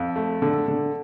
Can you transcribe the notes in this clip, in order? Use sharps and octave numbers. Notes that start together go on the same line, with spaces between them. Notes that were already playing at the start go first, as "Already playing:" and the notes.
Already playing: F2
A3
D3
D3